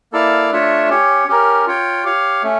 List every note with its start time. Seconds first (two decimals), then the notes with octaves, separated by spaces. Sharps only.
0.12 A#3 E4 A4 D5 F5
0.51 A3 D4 F4 C#5 E5
0.89 C#4 G4 C#5
1.28 C#4 G4 A#4
1.66 F4 C#5 G5
2.04 G4 C#5 F5
2.43 A3 C#4